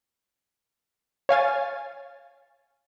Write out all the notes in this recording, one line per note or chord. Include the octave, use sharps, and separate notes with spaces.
C#5 F5 G#5 A6